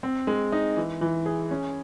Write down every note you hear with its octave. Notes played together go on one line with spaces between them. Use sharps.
C4
G#3
D#4
E3
E3
G#4
C#4